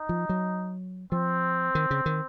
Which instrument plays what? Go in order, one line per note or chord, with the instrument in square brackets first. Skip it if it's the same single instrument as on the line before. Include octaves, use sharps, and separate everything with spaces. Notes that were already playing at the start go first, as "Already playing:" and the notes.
Already playing: [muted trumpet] D#4
[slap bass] F3
F#3
[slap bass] F3 [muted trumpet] C4
[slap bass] D#3
C#3
D#3